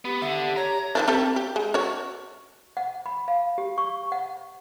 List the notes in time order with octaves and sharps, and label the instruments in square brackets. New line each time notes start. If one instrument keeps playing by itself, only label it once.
[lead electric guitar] B3 [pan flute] G4
[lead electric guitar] D3 [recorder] E5
[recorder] C#5 [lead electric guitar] A#5
[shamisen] D#3 F3 D4
C4 G4 A4
G4
G#3
F#4 C#5
[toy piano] F#5
B5
F5
G4
C#6
F#5